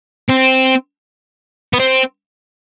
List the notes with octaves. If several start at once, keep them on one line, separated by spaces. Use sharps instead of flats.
C4
B3
C4